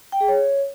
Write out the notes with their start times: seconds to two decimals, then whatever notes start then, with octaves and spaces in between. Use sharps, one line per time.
0.12 G5
0.20 G#4
0.28 C#5